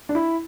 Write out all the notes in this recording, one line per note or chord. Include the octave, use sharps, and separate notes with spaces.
D4
E4